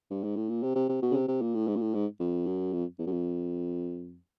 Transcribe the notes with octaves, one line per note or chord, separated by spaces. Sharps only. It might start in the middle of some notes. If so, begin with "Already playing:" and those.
G2
G#2
A2
A#2
C3
C3
C3
B2
C#3
C3
C3
A#2
A2
G#2
A#2
A2
G#2
F2
F#2
F2
E2
F#2
F2